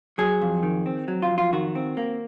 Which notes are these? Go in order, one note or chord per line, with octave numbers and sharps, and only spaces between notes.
F#3 G#4
F2
D#3
C4
F#3
F4
F2
F4
D#3 F#4
C4
A#3